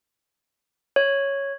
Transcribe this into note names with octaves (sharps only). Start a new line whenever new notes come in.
C#5